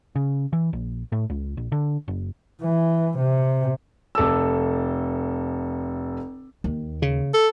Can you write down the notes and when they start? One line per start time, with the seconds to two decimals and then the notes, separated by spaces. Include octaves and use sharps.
0.16 C#3
0.53 E3
0.73 A#1
1.12 A2
1.30 C#2
1.57 A#1
1.72 D3
2.08 F#1
2.62 E3
3.18 C3
4.15 F1 A4 D6 E6
6.64 D#2
7.02 C#3
7.34 A4